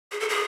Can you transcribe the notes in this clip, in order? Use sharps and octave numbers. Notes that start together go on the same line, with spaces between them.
G#4
A4
G#4